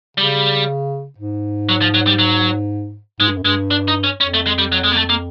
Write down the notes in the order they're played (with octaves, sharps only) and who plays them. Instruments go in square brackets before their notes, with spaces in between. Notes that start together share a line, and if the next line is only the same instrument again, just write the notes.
[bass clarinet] C#3 [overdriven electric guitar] G3
[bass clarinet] G#2
[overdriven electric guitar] F#3
F3
F#3
G3
F#3
[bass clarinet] G#2 [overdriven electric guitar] G#3
[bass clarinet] G2
F#2
[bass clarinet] G2 [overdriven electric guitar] G#3
[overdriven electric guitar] D4
D#4
C#4
[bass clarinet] F2 [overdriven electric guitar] C#4
[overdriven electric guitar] A3
G#3
G3
F#3
G#3
A#3
A3
A#3